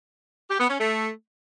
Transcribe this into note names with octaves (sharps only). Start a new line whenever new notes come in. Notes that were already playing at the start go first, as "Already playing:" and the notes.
G4
B3
C#4
A3